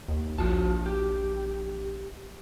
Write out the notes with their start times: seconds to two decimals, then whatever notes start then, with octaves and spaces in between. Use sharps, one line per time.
0.08 D#2
0.38 A#1 F3 F#4 A5
0.86 G4